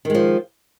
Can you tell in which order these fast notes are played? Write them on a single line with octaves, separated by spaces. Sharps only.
D#3 G#3 F3